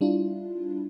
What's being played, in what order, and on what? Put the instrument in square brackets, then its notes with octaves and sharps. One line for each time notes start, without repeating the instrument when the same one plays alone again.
[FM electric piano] G3 D4 E4 F4